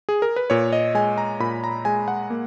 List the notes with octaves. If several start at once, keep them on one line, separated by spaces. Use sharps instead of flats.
G#4
A#4
B4
A#2 C#5
D#5
G#3 G#5
A#5
A#2 B5
A#5
G#3 G#5
F#5
A#3